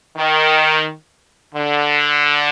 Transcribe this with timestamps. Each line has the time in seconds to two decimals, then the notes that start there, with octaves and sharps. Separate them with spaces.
0.17 D#3
1.54 D3